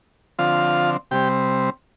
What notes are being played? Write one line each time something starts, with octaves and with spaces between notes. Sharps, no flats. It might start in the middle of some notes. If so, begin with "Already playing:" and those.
D3 F3 C4 F4 F5
C3 G3 C4 G4 G5